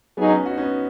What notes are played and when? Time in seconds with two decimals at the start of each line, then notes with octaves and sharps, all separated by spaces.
0.17 F#3 B3 D#4 G#4
0.29 C#4
0.46 F#4
0.51 D#4
0.58 C#4
0.62 B3